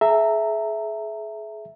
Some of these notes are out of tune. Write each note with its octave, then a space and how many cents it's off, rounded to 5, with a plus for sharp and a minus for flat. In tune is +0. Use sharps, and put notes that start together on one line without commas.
G#4 +35 E5 +0 A#5 -20